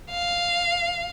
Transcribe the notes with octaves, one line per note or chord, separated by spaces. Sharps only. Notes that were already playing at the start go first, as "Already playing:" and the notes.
F5